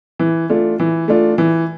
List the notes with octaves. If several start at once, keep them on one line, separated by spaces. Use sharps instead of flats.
E3
A3 D4 F4
E3
A3 D4 F4
E3